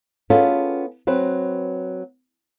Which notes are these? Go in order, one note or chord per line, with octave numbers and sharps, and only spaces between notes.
B3 C#4 F4 G#4 A4
F#3 C4 B4